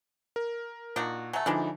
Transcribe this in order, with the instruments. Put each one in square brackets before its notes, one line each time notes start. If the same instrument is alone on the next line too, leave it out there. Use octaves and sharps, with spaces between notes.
[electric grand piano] A#4
[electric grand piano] A#2 [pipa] D4 D#4 F#4
[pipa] F#3 A3 [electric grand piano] G#5
[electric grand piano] D3 F3 D#4 [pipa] E3 G#3 D4